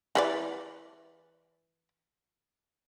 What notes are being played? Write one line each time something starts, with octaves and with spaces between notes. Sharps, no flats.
E3 B4 D5